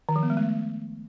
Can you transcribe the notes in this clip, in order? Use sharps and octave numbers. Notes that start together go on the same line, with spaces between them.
D#3
F3
B3
G#3
A3